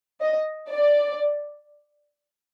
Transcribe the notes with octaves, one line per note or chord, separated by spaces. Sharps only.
D#5
D5